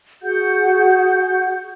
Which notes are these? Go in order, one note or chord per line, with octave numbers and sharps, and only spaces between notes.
F#4 G#4 F#5 G6